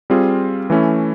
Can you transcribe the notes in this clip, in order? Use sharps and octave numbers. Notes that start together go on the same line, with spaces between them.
G3 C4 F4 G#4
E3 A3 C#4 E4